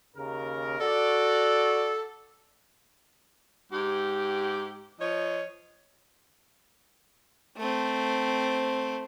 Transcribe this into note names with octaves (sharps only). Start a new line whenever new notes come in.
D#2 C#3 A#4
F#4 A4 D5
G#2 G4
F3 C#5 D#5
A3 C4